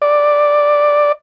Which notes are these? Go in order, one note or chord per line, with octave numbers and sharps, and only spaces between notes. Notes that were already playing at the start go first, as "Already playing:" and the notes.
D5